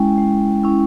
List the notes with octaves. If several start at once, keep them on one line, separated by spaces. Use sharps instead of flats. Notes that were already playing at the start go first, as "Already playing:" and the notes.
Already playing: G#3 C#4 E4 G5
G#3
C#4 E4